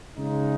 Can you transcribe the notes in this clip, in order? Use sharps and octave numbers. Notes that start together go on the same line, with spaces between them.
C#3 G#3 D#4